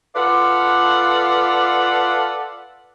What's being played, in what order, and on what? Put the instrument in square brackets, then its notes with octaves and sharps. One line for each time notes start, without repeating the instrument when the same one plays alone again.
[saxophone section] F4 A4 B4 D5 F5 F#5